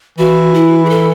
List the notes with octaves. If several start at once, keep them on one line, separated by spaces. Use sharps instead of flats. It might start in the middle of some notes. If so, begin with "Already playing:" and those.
E3 F#4
E4
G#4
A4